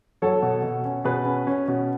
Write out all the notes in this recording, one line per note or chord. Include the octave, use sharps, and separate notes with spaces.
F#3 A4 C#5
B2
B2
C#4
B2 G#4 B4
C#4
C#4
B2